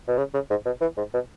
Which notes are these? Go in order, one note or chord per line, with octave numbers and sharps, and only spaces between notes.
B2
C#3
C#3
G#2
B2
E3
G#2
B2